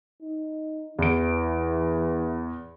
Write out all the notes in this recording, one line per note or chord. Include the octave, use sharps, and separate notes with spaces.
D#4
E2 E3 D7